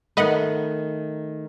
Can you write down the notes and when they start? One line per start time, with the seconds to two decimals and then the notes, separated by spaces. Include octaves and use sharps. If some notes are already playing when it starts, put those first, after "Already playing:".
0.17 D#3 A3 B4 D#5 F#5